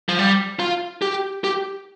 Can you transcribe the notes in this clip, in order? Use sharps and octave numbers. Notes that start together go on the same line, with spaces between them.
F3
G3
F4
G4
G4